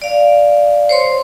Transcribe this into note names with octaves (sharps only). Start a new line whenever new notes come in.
D5 F5
C5 C#5 C6